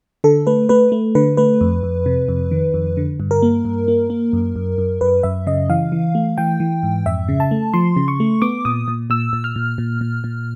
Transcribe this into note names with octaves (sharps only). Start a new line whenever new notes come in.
D3 A4
A3 B4
A3 B4
A3
D3 B4
A3 B4
F2
F2
C3
F2
D#3
F2
D3
G2
A#4
A#3
G2
A#3
A#3
F#2
F#2
F#2
F#2 B4
F#2 E5
C#3 D#5
E3 F5
E3
A3
E3 G5
E3
G#2
F2 E5
C#3
A5
A3
F3 C6
C#3
C#6
A3
B3 D6
A#2 D#6
A#2
A#2 E6
A#2
F6
A#2
A#2
A#2
A#2